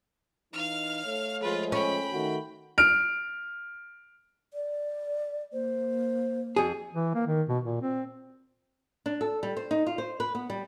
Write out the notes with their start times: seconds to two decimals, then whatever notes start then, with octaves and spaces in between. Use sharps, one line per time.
0.53 E3 D#4 F5 F6
1.04 A3 C#5
1.43 F3 G#3 F4 G#4 B4
1.72 C#4 G5 B5
2.13 D#3 A3 F#4
2.78 F6 D7
4.54 D5
5.53 A#3 C5
6.56 F2 F#4 G#4
6.93 E3
7.15 A#3
7.27 D#3
7.49 B2
7.64 A#2
7.82 C4
9.06 D4
9.21 A4
9.43 G3
9.57 C5
9.71 D#4
9.87 F4
9.98 C5
10.20 B4
10.35 B3
10.50 G3